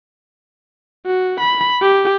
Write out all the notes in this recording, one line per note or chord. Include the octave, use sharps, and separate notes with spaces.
F#4
B5
G4